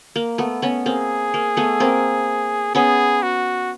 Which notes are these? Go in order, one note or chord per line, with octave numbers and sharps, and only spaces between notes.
A#3
A3 B3
B3 C#4
A#3 C4 G#4
A#3
A3 B3
A#3 C4
B3 C#4 G#4
F#4